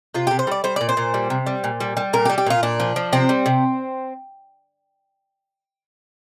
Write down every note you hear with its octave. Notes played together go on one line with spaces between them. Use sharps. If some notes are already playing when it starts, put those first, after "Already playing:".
C3 F4
C3 G4
C5
G3 D5
G3 C5
A#2 D5
C5
A#2
G3
C3
G3
A#2
G3
G3
A#2 A#4
G4
G3
G4
A#2 F4
A#2 D4
F3
F3
C3 C4
G3
C3